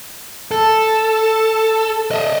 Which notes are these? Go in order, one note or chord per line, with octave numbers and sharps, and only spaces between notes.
A4
D#5 E5